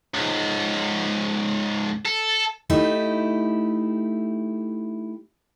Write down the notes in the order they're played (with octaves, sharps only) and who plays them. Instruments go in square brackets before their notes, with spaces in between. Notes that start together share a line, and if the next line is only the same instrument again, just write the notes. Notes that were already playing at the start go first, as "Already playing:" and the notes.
[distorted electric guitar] C#2 G#2
A4
[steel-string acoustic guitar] A3 D#4 E4 G4